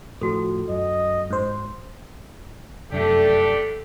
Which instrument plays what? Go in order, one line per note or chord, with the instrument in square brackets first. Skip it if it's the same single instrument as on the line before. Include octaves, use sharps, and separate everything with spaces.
[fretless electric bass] A2 F3 [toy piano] F#4 A4
[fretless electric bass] F#2 [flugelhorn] D#5
[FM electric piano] G#2 C5
[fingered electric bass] F1 F#2 [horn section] A3 D4 G4 [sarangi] A4